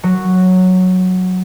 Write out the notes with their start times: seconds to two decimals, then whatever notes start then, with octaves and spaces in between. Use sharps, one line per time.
0.03 F#3